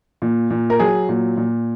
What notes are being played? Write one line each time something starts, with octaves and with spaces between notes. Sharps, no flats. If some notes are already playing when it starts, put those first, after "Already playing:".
A#2
A#2
A#4
F#3 G#4
A#2
A#2